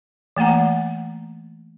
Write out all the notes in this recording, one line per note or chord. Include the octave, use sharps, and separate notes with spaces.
E3 A3 A#3 F#5 A#5